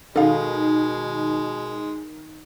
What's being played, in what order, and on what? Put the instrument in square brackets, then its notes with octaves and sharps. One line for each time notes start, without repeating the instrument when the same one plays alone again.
[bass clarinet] B2 [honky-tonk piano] D#3 [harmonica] G#3 [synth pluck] A4 F5